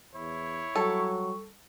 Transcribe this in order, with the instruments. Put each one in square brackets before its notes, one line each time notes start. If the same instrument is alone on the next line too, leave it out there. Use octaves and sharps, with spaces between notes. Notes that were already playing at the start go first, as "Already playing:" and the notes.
[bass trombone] E2 [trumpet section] E4 C#5
[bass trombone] F#3 [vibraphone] G3 C#6 [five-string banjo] A4